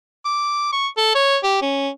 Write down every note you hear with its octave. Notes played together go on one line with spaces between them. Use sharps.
D6
C#6
A4
C#5
G4
C#4